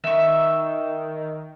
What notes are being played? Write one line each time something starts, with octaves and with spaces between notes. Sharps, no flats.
D#3 E5 C#6